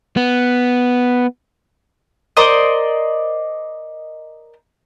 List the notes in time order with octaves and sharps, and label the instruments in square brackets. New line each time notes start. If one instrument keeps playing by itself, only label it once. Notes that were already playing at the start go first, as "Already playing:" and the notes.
[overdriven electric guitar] B3
[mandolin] A#4 C5 D5 D#5